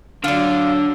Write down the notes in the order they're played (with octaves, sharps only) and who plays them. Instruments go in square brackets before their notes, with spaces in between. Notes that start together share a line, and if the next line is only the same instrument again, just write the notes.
[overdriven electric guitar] D3 [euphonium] F#3 [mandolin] F4 D5